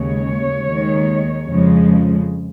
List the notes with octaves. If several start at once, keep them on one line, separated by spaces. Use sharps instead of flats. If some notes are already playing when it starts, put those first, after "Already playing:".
Already playing: D#2 C#3 G#3 C#5
D#2 D#3 G#3
F2 C#3 F3 G#3